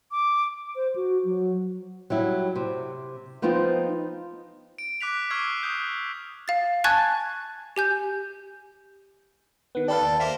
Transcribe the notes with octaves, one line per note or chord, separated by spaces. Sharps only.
D6
C5
F#4
F#3
F#3 G3 E4
C3
F3 B3 C4 D#4 F4
D7
D6 F#6 B6 F7
C#6 D6 E6 F6 G#6 C7
D#6 G6
F5 A6
G#5 A5 C#6 F#6 G#6 A6
G4 G#5 G6
D#3 B3 B4
G4 A4 B4 D5 F5 G5
D#2
A#3 G4 C5 E5